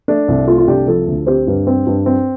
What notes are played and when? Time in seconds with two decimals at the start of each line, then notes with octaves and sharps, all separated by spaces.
0.08 A3 D4
0.28 C2
0.47 A3 F4
0.58 F4
0.68 C2 D4 G4
0.87 F3 F4 A4
1.07 D2
1.27 C4 G4 C5
1.47 G2
1.67 C4
1.87 G2
2.06 C4